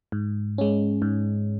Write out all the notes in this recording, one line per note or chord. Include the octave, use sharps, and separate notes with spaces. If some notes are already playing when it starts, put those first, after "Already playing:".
G#2
G#3 C#4
G#2